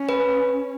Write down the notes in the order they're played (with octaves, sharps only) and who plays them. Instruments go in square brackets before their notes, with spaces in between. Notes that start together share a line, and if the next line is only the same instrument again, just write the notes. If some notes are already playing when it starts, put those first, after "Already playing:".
Already playing: [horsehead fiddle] C#4
[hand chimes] B4